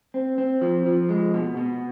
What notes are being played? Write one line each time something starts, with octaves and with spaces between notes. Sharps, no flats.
C4
C4
F3
F3
G#3
B2
B2